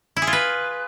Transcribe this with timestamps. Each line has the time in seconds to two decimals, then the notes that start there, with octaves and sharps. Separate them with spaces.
0.17 E4
0.22 G#4
0.27 F4
0.33 B4